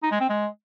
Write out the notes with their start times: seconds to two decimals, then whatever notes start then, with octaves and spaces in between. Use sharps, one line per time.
0.03 D#4
0.11 G#3
0.20 C4
0.29 G#3